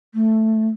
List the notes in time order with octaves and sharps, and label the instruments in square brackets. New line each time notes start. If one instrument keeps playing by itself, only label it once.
[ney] A3